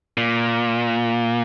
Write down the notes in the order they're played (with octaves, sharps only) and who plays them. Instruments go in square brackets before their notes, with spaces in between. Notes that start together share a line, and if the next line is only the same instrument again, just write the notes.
[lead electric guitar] A#2